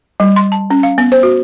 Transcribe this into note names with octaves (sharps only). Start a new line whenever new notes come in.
G3
C6
A5
C#4
F5
B3
C5
F#4